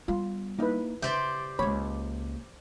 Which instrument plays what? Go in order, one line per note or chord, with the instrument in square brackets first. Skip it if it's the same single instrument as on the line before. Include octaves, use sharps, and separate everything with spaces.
[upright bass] G3 B3 [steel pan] F4
[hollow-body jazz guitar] A#3 D#4 [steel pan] E4 B4
[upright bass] C#3 [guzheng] G4 C5 D5 [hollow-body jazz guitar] E5
[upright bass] C#2 A#3 [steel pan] C#5 [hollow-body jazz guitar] B5